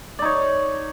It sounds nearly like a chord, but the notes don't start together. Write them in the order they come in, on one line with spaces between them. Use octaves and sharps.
D5 D#4 C#5